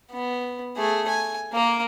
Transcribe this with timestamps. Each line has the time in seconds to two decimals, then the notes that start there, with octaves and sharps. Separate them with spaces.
0.11 B3
0.77 A3 G#4
1.08 G#5
1.53 A#3 A#4